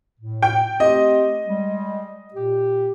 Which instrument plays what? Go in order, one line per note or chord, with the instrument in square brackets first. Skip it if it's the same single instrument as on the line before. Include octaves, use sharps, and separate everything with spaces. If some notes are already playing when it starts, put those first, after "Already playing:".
[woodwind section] A2
[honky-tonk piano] G5
[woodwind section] A3 C4 G4 [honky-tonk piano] D#5
[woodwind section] G3 G#3
A#2 G4